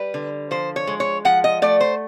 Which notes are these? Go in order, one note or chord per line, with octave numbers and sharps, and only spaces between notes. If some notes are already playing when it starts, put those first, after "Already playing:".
Already playing: G3 B4
D3
F3 C5
C#5
G#3
C#5
F3 F#5
D#5
A3 D5
C5